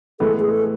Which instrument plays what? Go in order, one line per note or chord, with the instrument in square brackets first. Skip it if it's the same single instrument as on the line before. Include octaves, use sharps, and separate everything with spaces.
[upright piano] A2 E3 G#3 B3 [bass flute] A4
[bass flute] G#4
A4